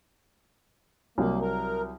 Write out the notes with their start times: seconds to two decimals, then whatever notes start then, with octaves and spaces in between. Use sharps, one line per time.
1.18 C2 F#3 A#3
1.41 A#4